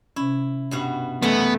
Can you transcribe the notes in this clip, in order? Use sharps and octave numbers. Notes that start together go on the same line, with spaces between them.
C3 C#4 E4
G2 B2 F#4
F#2 E3 A3 B3 D#5